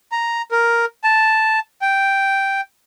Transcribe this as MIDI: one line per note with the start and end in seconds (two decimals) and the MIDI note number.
0.12 0.42 82
0.51 0.85 70
1.04 1.59 81
1.82 2.61 79